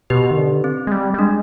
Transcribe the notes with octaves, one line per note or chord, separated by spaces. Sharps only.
B2 G4 B4
D#3
D3
C4
G#3
G3
G3
G#3 D4